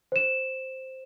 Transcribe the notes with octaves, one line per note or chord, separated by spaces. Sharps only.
C5 E7